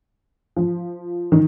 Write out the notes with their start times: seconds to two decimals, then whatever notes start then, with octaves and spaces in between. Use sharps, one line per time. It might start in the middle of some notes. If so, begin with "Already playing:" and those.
0.57 F3
1.32 D#3